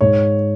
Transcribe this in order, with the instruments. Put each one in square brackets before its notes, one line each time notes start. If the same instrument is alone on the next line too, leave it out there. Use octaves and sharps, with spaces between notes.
[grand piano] G#2 C#5